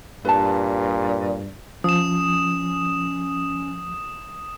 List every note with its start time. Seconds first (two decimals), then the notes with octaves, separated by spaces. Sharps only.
0.25 G2 A#2 B4 A5
1.84 F3 C#4 D#6 E7